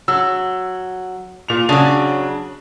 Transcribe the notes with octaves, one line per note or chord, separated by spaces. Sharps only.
F#3 E6
A#2 F7
C#3 F#3 D4